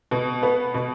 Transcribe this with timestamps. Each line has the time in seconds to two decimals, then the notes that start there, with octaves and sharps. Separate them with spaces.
0.11 B2
0.43 B3
0.74 B2